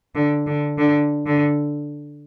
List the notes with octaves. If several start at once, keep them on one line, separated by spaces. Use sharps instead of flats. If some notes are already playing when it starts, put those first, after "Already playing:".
D3
D3
D3
D3